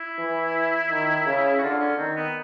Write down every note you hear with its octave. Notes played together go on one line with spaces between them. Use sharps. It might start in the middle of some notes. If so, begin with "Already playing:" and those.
Already playing: E4
E3
D#3
C#3
F#4
D3 F4
C#4
D#3 C4
B3